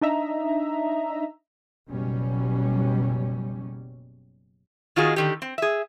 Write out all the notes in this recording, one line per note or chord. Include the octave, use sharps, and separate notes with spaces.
D4 D#4 D#5 E5 A#5
F#1 B2 F#3 G3 C#4
D#3 F4 F#4 G#4 D#5
D3 D#3 G4
C4
G#4 E5